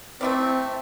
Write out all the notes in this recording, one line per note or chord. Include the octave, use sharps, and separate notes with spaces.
A3 C4 E4 D5